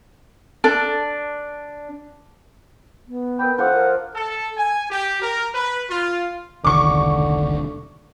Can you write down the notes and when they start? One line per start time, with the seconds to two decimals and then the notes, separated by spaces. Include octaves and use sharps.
0.64 D4 A4
3.08 B3
3.39 A#4 B4 G5 B5
3.58 F3 F4 A4 F#5 D6 G6
3.74 A#4
4.14 A4
4.57 G#5
4.90 G4
5.21 A#4
5.54 B4
5.89 F4
6.65 E1 C2 D3 D#3 C#6 D6